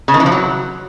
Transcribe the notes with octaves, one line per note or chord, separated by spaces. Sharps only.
C#3
D#3
E3
F3
F#3